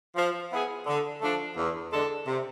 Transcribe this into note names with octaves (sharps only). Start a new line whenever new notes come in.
F3
B3 E4 G#4
D3
F3 A3 D4
E2
D3 G#3 D4 A4
C3